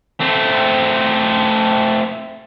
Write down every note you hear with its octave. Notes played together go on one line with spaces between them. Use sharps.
A3 C4